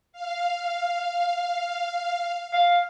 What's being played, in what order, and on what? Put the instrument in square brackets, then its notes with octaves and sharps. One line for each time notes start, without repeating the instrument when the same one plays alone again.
[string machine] F5
[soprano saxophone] F5